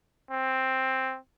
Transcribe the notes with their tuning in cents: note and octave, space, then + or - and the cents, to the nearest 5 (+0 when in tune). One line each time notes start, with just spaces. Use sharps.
C4 +5